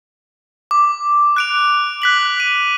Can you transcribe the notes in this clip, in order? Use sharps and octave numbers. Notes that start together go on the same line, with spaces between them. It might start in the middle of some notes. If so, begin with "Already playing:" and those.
D6
F#6 D7 F7
F#6 B6 F#7
D#7